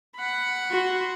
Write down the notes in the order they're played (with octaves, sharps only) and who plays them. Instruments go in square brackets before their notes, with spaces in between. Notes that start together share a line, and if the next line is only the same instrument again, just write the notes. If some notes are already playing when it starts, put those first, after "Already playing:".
[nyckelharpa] F#5 B5
[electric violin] F#4 C6